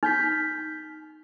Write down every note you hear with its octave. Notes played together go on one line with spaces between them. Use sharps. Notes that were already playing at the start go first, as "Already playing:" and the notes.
D#4 F6 G6 B6